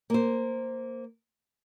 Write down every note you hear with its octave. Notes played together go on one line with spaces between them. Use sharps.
A#3 C5